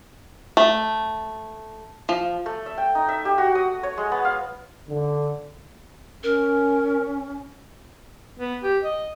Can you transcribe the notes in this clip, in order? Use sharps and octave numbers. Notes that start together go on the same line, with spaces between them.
A3
F3
A3
E5
G5
D#4
E5
G4
F#4
D#6
C#5
G#3
B3
F5
D3
C#4 A#4
B3
G4
D#5